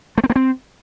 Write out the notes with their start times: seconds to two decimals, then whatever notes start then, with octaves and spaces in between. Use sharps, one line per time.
0.18 A3
0.24 C4
0.30 A#3
0.36 C4